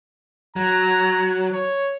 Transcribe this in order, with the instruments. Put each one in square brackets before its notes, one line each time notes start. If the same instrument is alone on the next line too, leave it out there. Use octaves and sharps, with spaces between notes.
[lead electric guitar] F#3 [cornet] A#5
[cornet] C#5